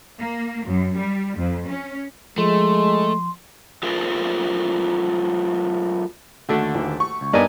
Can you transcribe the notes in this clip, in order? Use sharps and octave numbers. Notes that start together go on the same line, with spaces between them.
A#3
F#2
G3
F2
C#4
F3 G#3 A3 C6
F#3 A3 F4 G#4 A#4 C5
D#2 D3 A3 D4 F#4
D#1
C#6
C#2
G2 B3 D#4 A#4 D5 D#5 G#5